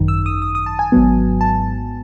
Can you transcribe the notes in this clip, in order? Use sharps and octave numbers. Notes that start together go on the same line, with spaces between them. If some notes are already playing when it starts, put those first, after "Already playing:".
Already playing: G#1 F#2 D#3
E6
D#6
D#6
D#6
A5
G#5
G#1 G#2 F#3 B3
A5